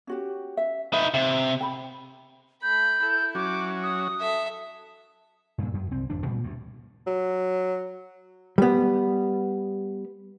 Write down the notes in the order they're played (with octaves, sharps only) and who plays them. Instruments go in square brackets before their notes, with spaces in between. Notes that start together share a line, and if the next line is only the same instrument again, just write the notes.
[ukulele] C#4 F#4 G4
E5
[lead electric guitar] D#4 B4 [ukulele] E5
[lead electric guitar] C3 [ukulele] E5
[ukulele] G5 B5
[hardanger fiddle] A3 B5 [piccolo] G6
[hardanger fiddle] E4 [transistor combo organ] A4
[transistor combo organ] F#3 C#4 F#4 [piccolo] D6
[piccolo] D#6
[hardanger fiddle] A4 E5
[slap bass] G2 A#2
F#2
C2 C4
G#1 F2 D4
A#2 G3
D2 G2
[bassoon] F#3
[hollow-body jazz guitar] G3 B3